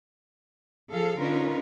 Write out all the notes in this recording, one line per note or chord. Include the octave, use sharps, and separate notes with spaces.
F3 G#4 A4 F5
D3 C#4 D#4 F4 A#4 B4